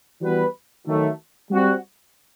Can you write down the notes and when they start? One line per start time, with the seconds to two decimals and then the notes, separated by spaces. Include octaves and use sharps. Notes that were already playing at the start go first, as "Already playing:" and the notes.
0.21 E3 G3 B3 F#4 B4
0.86 D#3 F#3 A3
1.51 G3 C4 F#4